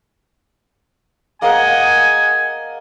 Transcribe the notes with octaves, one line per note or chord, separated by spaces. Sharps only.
A#3 G#4 D5 D#5 F#5 G#5